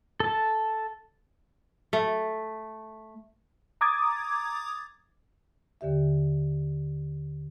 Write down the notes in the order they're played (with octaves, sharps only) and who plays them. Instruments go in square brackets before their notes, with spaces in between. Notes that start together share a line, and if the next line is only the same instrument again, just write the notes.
[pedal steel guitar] A4 A5
[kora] A3
[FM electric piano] A#5 D6 D#6 G#6 A6
[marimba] D#2 D3 G4 E5